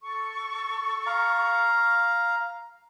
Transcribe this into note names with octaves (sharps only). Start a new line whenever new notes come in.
A4 C#6
F5 A#5